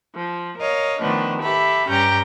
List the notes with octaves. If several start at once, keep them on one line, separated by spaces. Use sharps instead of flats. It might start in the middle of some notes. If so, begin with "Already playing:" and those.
F3
A#4 C#5 D#5 F5
D#3 F3 A3 B3 D4
G4 A4 E5 B5
G2 C#4 G4 A#5 G6